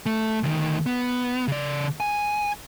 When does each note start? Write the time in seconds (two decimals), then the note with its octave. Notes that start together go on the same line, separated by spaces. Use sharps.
0.06 A3
0.43 D2 D#3
0.86 B3
1.48 C#3 D5
2.00 G#5